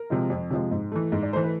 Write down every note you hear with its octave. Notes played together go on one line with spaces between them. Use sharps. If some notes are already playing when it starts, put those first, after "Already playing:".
Already playing: A#4
C3 F3 G#3
F2
C3 F3 G#3
G#2
E3 A3
G#2
D5
E3 A3 C5
B4